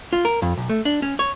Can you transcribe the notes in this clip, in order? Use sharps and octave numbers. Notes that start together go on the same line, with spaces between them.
F4
A#4
F2
B1
A3
D4
C#4
C#5